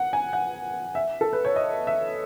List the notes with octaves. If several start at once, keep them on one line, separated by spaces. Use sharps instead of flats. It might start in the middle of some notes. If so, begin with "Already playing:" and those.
Already playing: F#5
G#5
F#5
E5
A4
B4
C#5
D#5
E5